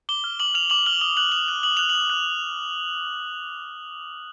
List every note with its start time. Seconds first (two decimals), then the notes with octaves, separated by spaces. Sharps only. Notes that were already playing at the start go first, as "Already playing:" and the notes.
0.09 D6 G7
0.24 F6
0.40 D6 F#7
0.54 F6 F7
0.70 D6 F#7
0.86 F6 G7
1.01 D#6 G7
1.17 F#6 F#7
1.32 D#6 F7
1.48 F#6
1.63 D#6 F#7
1.77 F#6 F7
1.89 F#7
1.94 D#6
2.10 F#6